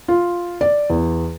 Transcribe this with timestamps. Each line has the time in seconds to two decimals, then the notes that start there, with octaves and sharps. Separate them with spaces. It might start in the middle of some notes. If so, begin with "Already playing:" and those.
0.08 F4
0.61 D5
0.90 E2